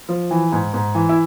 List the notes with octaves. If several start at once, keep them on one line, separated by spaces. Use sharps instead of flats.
F3
E3
G#2
G#2
E3
E4